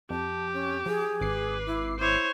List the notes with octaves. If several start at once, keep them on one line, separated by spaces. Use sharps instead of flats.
F2 G4 A5
C#4
F3 G#4
G#1 B4 D6 C7
E4
E4 C5 C#5